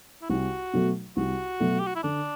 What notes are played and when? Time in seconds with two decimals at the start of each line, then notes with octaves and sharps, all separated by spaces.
0.22 E4
0.30 C2 F#4
0.73 B2 F#3 A3
1.17 C2 F#4
1.60 B2 F#3 A3
1.79 G4
1.87 F#4
1.95 E4
2.03 D3 D4